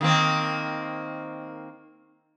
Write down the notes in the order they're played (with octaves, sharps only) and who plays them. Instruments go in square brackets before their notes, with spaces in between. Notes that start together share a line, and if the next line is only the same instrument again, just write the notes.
[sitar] D#3 A#3 C4